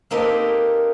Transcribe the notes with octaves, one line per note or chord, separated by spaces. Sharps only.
A#3 C4 D#4 G4 A4 B4